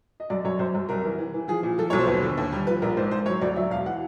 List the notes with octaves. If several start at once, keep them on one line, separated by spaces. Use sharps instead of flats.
D#5
F#2 D5
F#2 C#5
F#2 C5
F#2
C2 A#4
E3
E3
E3
F3 G#4
A#2
F3 A4
B1 C#5
C5
D#2 B4
D3
D#2
G3
F3 B4
A#1 A#4
G#2 C5
G#2 C5
F#3 C#5
D2 D5
F#3 E5
E1 F5
E3 F#5